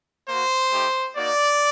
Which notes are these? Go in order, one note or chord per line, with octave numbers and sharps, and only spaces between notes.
A#3 F#4 C5
A3 D#4 G4
A#3 D#4 F#4 D5